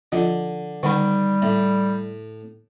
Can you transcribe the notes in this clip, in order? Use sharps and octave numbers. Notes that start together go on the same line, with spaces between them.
D3 F3 F4 D#5
D3 D#3 G3 F#5 B5
A2 E5